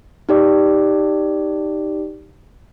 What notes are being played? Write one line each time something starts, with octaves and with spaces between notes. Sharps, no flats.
D#4 G4 D5